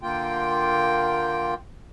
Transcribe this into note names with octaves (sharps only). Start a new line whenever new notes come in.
D3 A#3 F4 G5